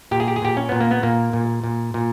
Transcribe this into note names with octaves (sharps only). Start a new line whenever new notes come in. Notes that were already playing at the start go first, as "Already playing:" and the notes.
A#2 G4
G#4
G4
G#4
A#2 G4
C#4
A#2 B3
A#3
B3
A#2 A#3
A#2
A#2
A#2